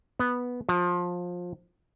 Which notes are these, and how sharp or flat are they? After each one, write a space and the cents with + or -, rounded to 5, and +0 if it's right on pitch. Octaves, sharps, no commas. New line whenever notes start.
B3 -5
F3 +20